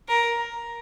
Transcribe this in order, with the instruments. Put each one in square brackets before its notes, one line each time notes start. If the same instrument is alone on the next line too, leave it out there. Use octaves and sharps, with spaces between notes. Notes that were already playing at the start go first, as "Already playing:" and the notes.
[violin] A#4